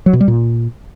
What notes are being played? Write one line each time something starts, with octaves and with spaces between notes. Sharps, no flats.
F#3
B2
G3
A#2